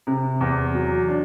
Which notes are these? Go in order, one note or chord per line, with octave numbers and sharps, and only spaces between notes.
C3
E2
F#3
D4